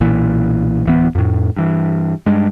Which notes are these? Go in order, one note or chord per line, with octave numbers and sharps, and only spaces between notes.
B1 A#2 E3
D1 E3 B3
F2 A2
G2 E3
G2 G#3